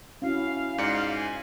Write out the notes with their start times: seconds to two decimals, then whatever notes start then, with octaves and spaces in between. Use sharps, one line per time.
0.22 C#4 E4 F#4 F5
0.78 G#2 D5 C#7
1.16 G#5